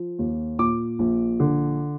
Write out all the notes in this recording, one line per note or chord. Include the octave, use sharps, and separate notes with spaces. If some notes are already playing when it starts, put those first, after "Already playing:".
Already playing: F3
D#2
A#2 D6
A#1
D3